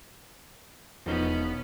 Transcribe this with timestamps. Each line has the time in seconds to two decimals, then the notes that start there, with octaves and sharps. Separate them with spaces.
1.06 E1 F3 B3 C#4 D#4